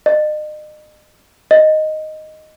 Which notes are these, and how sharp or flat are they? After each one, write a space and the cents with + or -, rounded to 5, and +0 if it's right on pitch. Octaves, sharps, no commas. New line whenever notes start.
D#5 -40
D#5 +0